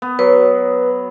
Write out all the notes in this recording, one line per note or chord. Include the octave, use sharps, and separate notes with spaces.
B3
F#3 B4